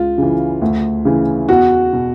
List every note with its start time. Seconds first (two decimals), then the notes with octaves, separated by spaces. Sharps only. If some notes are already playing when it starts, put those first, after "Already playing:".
Already playing: C#2 F4
0.18 C#3 E3
0.61 D2
1.05 C#3 E3
1.49 E2 F#4
1.93 B2